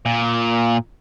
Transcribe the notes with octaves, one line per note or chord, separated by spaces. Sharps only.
A#2